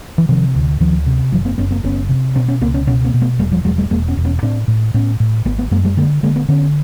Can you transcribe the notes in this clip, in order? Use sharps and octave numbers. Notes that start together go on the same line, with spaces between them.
E3
C3 D#3 F3
D2
D2 D#3 F3
C3
F#1 E3 F#3
A#3 C4
F#1 B3 C#4
A#3 C4
F#1 B3 C#4
C3
B2 C4 D4
B3 C#4
C#2 A#3 C4
B3 C#4
B2 B3 C#4
A#3 C4
B2
A3 B3
E1 G3 A3
F3 G3
E1 F#3 G#3
G3 A3
E1 G#3 A#3
B3 C#4
E1
B3 C#4
A2 C4 D4
A2
A2 B3 C#4
A2
G#1 A3 B3
A3 B3
F#2 G#3 A#3
G3 A3
D3 G#3 A#3
D3 G#3 A#3
A3 B3
D3 B3 C#4